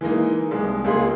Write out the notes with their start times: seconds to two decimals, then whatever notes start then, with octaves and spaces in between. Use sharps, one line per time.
0.01 E3 G#3 A#3 D#4
0.51 C2 G#3
0.84 C#2 A#3 F4 G#4 C6